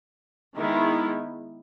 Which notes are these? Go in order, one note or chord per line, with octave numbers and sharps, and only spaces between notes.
D#3 G#3 B3 E4